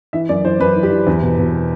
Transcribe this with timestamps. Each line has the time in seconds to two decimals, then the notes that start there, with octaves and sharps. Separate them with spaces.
0.13 E3 E5
0.29 F#2 D5
0.44 E3 C5
0.60 F#2 B4
0.76 E3
0.83 G4
0.91 E3
1.07 E2
1.22 B2
1.38 B2